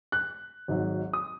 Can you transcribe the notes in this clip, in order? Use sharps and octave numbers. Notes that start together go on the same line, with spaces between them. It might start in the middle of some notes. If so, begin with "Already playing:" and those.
F#6
G#1 G#2 F#3
D#6